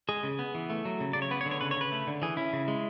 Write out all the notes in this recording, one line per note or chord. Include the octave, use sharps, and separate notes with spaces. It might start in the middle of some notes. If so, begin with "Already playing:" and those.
G#3 G#4
C#3
B3
E3
A3
F#3
C#3
C#3 D5
C#5
B3 B4
C#5
D3
C#5
C#3 B4
C#5
C#3 B4
A3
D3
E3 G#4
C#4 E4
C#3
G#3